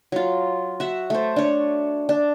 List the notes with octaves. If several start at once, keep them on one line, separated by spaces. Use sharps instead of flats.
F#3 F4
F#4 E5
A3 C5
D4 C#5
D4